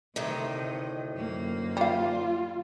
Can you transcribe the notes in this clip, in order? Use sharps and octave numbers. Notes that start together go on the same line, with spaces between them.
D2 A2 C3 D#3 D#5
F#2 A#3
G3 F4 F5